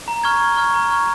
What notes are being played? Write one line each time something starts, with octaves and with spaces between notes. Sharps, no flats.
A#5
C#6 F6 G#6
A#5
C#6 F6 G#6
A#5
C#6 F6 G#6